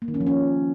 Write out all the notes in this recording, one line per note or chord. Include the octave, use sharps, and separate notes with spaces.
A#3
D#3
C#4
F3
C#4